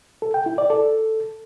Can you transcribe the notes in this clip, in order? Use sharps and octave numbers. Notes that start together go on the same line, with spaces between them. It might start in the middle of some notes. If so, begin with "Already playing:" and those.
A4
G5
E4
D5
A4